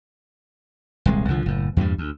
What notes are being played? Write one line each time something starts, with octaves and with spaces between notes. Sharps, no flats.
D#1 C2 G#3
C2 D3 F3
F#1 A2
E2 G2 A#2 G3
D2